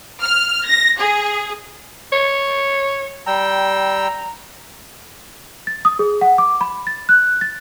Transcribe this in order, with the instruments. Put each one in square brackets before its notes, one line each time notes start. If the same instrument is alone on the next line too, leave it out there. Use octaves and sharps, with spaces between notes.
[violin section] F6
A#6
G#4
[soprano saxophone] C#5
[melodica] G3 G5 E6 [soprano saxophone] A#5
[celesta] A6
D#6
G#4
F#5
D6
B5
A6
F#6
A6